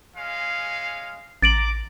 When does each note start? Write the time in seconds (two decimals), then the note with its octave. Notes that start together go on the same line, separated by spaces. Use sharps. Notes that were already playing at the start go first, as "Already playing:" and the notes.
0.16 G#3 C#4 F5
1.42 A1 A#5 D6 A6 D7 F#7